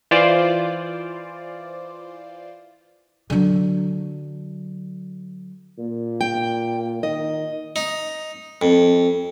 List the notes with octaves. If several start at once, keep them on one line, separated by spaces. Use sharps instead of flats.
E3 F4 C5 D5
D3 F#3
A#2
G5
D#3 D#5
D#4
F2